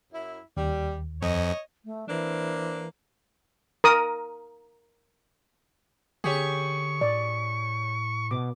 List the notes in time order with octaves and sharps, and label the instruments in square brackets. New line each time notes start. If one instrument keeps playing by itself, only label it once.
[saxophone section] F#2 E4
[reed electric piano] D#2 [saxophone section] G3
[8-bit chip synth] F2 [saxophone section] C#5 D#5
[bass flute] A3
[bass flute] E3 [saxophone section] A#3 C4 D4
[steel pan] A#4 D#6
[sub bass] D3 [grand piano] C#4 G4 G#4 [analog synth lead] C#6
[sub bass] A2 [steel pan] D5
[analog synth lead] B2 [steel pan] D6